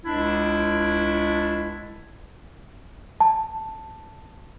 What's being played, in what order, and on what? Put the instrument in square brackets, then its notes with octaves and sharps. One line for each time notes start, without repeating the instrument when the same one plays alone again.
[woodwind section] C#2 D4 E4
[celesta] A5